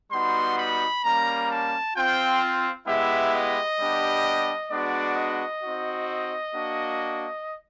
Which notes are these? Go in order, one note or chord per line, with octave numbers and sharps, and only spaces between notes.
G3 B3 D#4 F#4 C6
B5
G3 A#3 C#4 A#5
A5
C4 F4 G5
G#3 B3 E4 G4 E5
D#5
G3 B3 D4 G4
G#3 B3 D4 F#4 D5
D#5
C4 D#4 F#4
A#3 D4 F#4